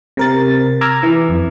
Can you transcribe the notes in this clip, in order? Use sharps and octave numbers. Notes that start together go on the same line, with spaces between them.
C3 A#4 A6
A#5 D6 E6 F6 G#6
E3
F2